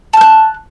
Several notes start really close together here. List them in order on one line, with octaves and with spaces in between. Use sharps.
A5 F6 F#6